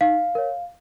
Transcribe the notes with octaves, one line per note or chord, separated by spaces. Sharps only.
D#4 F5
A#4 C#5